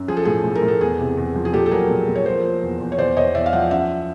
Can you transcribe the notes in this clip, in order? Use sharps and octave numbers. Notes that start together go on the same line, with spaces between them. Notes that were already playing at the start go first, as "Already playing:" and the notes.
Already playing: F#2
F3 G#4
A4
A2 G#4
A2
A#4
A2
A4
E2 G#4
C3
E2
F3
G#4
A#2 G4 A4
A4
F#3 G#4 A#4
A#2
A#2
C#5
F3 A#4 C5
F3
E2
E2
C#5
E2 C5 D5
E2 C#5 D#5
E2 D5 E5
F5
F3 E5 F#5
F#2 E5 F#5